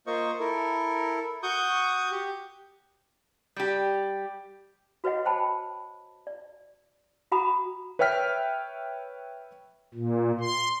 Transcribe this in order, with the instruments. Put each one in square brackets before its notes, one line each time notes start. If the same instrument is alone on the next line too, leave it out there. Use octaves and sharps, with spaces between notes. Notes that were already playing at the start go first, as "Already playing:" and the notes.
[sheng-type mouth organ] A#3 F4 C5 D#5 C#6
E4 A4 A#4
F#4 C#6 D#6 G6
G4
[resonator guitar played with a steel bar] G3 G4
[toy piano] F#4 B4 C#5 D#5 F#5
C5 G5 A5 B5
D5
F#4 F#5 A#5 B5 D#6
[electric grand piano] B4 C#5 E5 G5 F6 B6
[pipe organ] A#2
C6